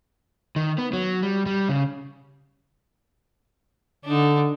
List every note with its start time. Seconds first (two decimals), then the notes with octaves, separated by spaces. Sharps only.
0.56 D#3
0.78 B3
0.93 F#3
1.22 G3
1.46 G3
1.69 C#3
4.05 D3 D4 D#4